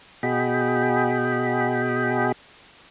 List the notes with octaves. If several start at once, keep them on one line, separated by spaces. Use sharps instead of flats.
B2 F#4 G#4 D#5 G5 B5